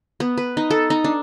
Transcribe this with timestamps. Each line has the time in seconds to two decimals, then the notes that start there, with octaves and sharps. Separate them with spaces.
0.20 B3
0.38 B4
0.57 D#4
0.70 A4
0.90 D#4
1.04 D4